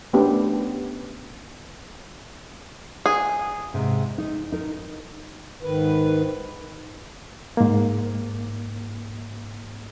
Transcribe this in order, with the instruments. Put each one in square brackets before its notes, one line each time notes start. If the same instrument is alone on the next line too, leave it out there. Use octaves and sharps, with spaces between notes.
[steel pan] A3 B3 C#4 D4 G4 A#4
[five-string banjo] G#4
[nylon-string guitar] G#2 C3
D#4
D#4 A#4
[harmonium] G#2 D#3 B4
[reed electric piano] G#2 A#3